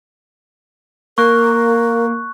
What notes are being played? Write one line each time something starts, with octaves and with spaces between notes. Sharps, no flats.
A#3 A#4 C#6 F#6